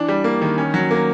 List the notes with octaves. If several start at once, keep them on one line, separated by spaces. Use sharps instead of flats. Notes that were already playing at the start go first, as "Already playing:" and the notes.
Already playing: E3 D4
G3
A#3
D#3
C#4
F#3
A#3